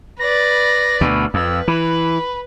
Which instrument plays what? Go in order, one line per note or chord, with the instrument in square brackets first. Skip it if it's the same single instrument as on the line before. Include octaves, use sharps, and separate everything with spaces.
[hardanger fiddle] B4 D5 [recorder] A#6
[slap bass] D2 B2 [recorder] B5
[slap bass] F2 [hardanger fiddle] B4 [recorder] E6
[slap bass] E3 [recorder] B5